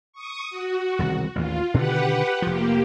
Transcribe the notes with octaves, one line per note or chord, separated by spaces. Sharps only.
C#6 D#6
F#4
E1 C2 D#3
A1 D#2 F4
B2 D3 D#3 G4 B4 F#5
F1 F3 A#3 G4